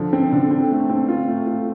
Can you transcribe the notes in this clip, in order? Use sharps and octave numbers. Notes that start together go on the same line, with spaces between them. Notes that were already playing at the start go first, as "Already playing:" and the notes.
Already playing: D3 F3
C4
D3
C4
A3
C4
F4
A3
F4